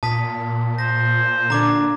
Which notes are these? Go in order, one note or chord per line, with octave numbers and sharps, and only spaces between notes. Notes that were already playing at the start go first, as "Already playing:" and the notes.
A#2 A5 D#6 B6
C5 A#6
D3 D4 A#5 D6 G#6